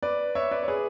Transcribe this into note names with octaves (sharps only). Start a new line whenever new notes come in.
B4 D5
C#5 E5
B4 D5
C#5
G#4 B4